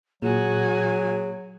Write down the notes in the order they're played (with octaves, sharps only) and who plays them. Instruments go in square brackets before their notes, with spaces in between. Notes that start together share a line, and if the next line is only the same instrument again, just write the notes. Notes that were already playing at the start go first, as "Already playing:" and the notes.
[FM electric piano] A#2 [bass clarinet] F#3 [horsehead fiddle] F#4 G#5 [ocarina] G#4